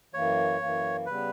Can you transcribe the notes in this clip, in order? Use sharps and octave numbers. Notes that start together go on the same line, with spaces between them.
F#2 E3 A#3 C#5
F#2 E3 A#3
C#3 G3 B3 B4